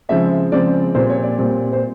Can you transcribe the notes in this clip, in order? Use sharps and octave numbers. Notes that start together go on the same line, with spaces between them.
C#3 F3 G#3 C4 E5
C#3 F3 G#3 C4 D5
A#2 G3 C4 C5
C#5
D5
A#2 G3 C4
C5